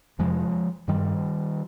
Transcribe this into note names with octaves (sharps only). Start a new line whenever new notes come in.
F2 C3 F3 G#3
G2 D#3 G3